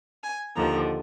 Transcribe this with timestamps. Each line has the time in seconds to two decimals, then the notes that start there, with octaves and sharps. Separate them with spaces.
0.23 G#5
0.56 D#2 D3 F3 A#5